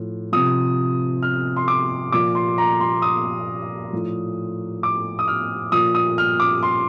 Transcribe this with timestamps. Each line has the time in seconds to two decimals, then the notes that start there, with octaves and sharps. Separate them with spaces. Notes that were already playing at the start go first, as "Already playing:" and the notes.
Already playing: A2 F3
0.32 C3 F3 D#6
1.23 F6
1.57 C6
1.68 D6
2.12 A#2 F3 D6
2.35 C6
2.58 A#5
2.81 C6
3.02 D#6
3.93 A2 F3
4.83 D6
5.19 D#6
5.28 F6
5.72 A#2 F3 D#6
5.95 D#6
6.18 F6
6.40 D6
6.63 C6